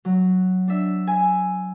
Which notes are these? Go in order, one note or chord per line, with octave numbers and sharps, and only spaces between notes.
F#3
D4 E5
E5 G#5